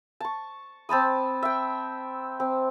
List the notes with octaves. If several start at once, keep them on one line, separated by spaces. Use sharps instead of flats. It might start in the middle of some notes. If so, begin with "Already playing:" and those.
A5 C#6
C4 A5 B5 D#6
E5 G5
C4